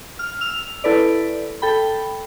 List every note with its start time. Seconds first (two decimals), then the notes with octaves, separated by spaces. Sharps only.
0.19 F6
0.41 E6 F7
0.84 E4 A4 B4 D5
1.62 A4 G5 B5